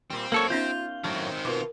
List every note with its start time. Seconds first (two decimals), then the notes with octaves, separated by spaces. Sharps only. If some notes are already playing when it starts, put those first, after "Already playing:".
0.10 A#2 G3 C4
0.32 F#2 A#3 A4 C#5
0.50 B3 C#4 D#4 F4 G6
1.04 F#2 A2 D#3 F#3 C4 A5
1.45 B2 F4 A#4 D6